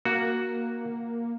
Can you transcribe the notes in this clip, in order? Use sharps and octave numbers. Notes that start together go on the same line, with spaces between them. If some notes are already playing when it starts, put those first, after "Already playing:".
A#3 F#4